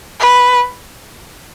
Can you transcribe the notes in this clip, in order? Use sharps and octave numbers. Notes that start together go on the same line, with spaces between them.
B4